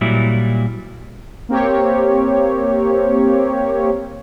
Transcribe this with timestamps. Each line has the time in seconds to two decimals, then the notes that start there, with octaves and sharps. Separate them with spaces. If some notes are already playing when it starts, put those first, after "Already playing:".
0.01 A#2 F#3 G3 E4
1.49 A#3 C4 G4 C#5